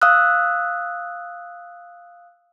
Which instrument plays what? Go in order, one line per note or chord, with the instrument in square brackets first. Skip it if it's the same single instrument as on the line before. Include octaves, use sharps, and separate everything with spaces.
[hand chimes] F5 D#6 E6 F#6